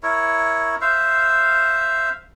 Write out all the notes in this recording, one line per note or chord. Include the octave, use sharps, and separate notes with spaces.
E4 A#4 C#5
C5 E5 F5